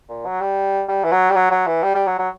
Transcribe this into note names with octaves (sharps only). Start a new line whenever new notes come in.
A#2
F#3
G3
G3
E3
F#3
G3
F#3
F#3
E3
G3
G3
F#3
F#3